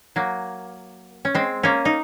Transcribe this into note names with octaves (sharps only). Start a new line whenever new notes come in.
F#3 A#3
C#4
G#3 C4
A#3 C#4
D#4